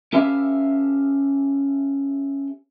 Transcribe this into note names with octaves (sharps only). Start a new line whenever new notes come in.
C#4 G4 A4 B4 E5 F5